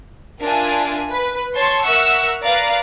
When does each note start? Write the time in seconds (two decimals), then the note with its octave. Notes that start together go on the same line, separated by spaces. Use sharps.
0.41 D4 F4 A#4 E5 G#5
1.11 B4
1.55 C#5 A5 C6 C#6
1.86 A#4 E5 F#5 C#6 E6
2.43 B4 D5 F5 A#5